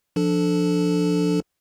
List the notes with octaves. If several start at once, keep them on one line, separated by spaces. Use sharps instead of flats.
F3 D4 A4